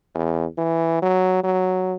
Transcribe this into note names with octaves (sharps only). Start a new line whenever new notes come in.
E2
E3
F#3
F#3